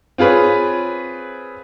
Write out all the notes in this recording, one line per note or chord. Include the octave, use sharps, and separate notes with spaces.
C4 F4 G#4 B4 C#5